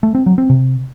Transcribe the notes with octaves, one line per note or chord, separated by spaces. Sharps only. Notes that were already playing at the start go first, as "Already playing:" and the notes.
A3
C4
F#3
C4
C3